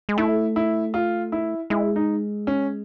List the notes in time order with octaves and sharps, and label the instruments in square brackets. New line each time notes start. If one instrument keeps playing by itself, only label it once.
[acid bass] G#3
[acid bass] A3 [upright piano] E4
[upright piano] E4
F4
E4
[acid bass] G#3 [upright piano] E4
[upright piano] D#4
C#4